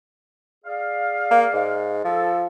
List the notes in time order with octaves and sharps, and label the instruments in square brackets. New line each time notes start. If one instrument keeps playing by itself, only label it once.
[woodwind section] G#4 D5 F5
[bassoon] A#3
G#2
[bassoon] F3 [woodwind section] A4